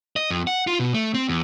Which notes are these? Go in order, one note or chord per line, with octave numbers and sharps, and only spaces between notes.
D#5
F2
F#5
F4
B2
A3
C4
E2